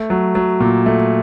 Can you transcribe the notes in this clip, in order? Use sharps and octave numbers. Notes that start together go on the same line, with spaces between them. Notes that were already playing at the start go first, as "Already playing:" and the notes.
Already playing: A3
F#3
F#3
A#2
A3